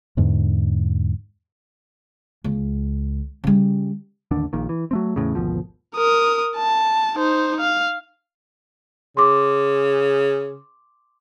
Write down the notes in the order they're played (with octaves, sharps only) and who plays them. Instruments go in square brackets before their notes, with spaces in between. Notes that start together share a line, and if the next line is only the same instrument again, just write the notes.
[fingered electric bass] E2 G#2 D3
[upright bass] C#2
C#3 G3
[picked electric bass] A1 D#2 D3 D4
A#1 A#2 D#3
E3
F#3 A3 C4
E2 A2 C#3
G#1 D2 B2 F3
[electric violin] A#4 D#6
A5
D#4 C5
F5
[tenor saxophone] C#3 [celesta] C6 D6